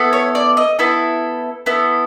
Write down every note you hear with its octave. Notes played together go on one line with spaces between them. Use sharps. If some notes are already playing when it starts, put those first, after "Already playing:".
Already playing: B3 E4 A4
C#5
D5
D#5
B3 E4 A4
B3 E4 A4